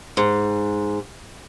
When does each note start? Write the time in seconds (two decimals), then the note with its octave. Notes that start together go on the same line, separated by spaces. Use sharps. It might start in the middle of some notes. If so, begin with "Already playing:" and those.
0.17 G#2